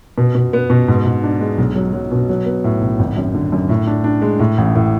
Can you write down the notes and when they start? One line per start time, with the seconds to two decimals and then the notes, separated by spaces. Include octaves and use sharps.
0.18 B2
0.35 B2
0.53 B3
0.70 B2
0.88 G#2
1.06 G#2
1.23 D4
1.41 G#3
1.58 B1
1.76 F#3
1.93 F#3
2.12 B2
2.29 F#3
2.46 B3
2.64 A2
2.81 B1
2.99 G#1
3.17 F#2
3.35 D3
3.52 F#2
3.69 A2
3.87 D4
4.04 D4
4.22 G#3
4.39 A2
4.58 A1
4.76 A2